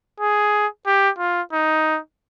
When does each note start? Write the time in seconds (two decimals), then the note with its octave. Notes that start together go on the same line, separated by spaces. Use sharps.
0.20 G#4
0.86 G4
1.18 F4
1.53 D#4